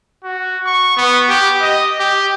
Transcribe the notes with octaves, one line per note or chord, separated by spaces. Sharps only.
F#4
C#6
B3
G4
D#5
G4